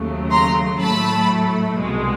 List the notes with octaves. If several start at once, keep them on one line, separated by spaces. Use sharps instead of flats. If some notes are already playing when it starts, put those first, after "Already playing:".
Already playing: D#2 C#3 F#3 A3
A#5 C6
A2 F#3 A3 A5 B5
C2 B2 G#3